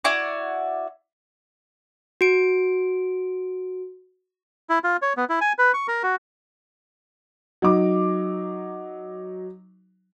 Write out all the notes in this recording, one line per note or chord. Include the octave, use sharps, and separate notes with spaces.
E4 F#4 D5
F#4 D7
E4
F4
C#5
B3
E4
G#5
B4
C#6
A#4
F#4
F#3 D#4 D6